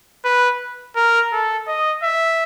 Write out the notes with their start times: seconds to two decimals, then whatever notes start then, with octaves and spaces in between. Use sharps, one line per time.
0.24 B4
0.96 A#4
1.32 A4
1.67 D#5
2.03 E5